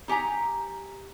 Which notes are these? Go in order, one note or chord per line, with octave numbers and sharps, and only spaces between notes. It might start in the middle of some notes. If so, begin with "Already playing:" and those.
D#4 G4 G#5 A#5